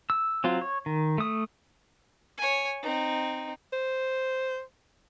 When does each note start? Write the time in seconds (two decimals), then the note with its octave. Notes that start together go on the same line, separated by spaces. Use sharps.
0.10 E6
0.44 F#3 C4 F4
0.61 C#5
0.86 D#3
1.18 A3 D#6
2.38 C#5 G#5
2.82 C4 D#4
3.73 C5